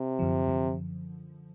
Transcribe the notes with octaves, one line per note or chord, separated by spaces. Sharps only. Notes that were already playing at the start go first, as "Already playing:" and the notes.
Already playing: C3
F#2 D3 F3
F#2 D3 F3